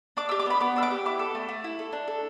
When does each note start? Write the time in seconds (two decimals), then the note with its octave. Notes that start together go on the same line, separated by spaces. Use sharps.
0.17 D4 D6
0.29 G4 E6
0.40 D6
0.46 B3 B5
0.61 B3 D6
0.76 D4 E6
0.83 D6
0.91 G4
1.06 E4 D6
1.19 A4
1.35 A3
1.49 A3
1.64 E4
1.79 A4
1.93 D4
2.08 A4